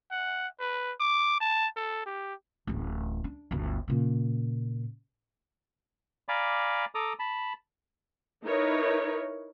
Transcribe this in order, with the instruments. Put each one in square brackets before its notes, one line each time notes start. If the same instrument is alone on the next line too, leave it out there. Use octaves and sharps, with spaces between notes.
[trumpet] F#5
B4
D6
A5
A4
G4
[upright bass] D1 A1
D4
G1 D2
A#2 C#3
[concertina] D5 F5 G#5 A#5 B5 D6
A4 A#5 D6 D#6
A5 B5
[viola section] D#4 E4 A#4 B4 C#5